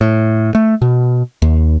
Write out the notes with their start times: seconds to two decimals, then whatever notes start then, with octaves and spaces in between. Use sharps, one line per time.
0.01 A2
0.55 A3
0.82 B2
1.42 D#2